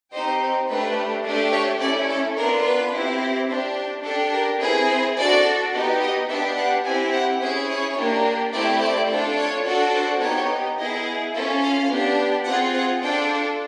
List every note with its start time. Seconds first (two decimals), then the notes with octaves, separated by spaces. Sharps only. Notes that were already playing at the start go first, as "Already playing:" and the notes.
0.12 C4 D#4 G4 C5
0.68 A3 D4 G4 B4
1.24 A3 D4 G4
1.52 C#5
1.80 A3 C#4 E4 D5
2.08 A4
2.37 B3 D4 F4 A#4
2.64 B4
2.92 C4 E4 G4
3.49 D4 G4 C5
4.04 D4 G4 A4
4.33 A#4
4.61 C4 E4 G#4 B4
4.89 C5
5.16 D4 F#4 A4 D5
5.73 B3 D#4 G4
6.01 D#5
6.29 B3 D4 G4 E5
6.57 F#5
6.85 C4 E4 G4 G#5
7.13 F#5
7.41 C#4 E4 G#4 C5
7.69 C#5
7.97 A#3 D4 G4
8.53 A3 C4 E4 G4 D5
8.81 D5
9.09 D4 F4 A4
9.37 C#5
9.65 D4 F#4 A4
9.93 C5
10.21 B3 D#4 G4 C#5
10.77 B3 E4 G#4 D#5
11.33 C#4 F4 A4 E5
11.61 F5
11.89 B3 D4 G4
12.45 C4 F4 G#4 F#5
12.73 F#5
13.02 D4 F4 A4 G5